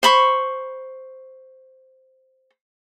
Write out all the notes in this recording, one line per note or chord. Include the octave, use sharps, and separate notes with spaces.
C5 B5 C#6